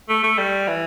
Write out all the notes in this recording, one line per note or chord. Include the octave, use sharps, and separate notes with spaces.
A3
A3
G3
E3